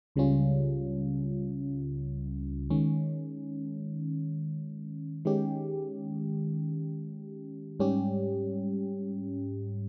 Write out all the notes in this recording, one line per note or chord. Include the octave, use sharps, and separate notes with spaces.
C#2 C#3 G3 C#4 F4
D#3 G#3 C#4
D#3 G#3 C#4 G4
G#2 G3 C#4 G4